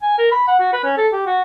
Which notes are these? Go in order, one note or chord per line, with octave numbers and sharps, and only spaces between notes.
G#5
A#4
B5
F#5
F#4
B4
C#4
A4
G4
F#4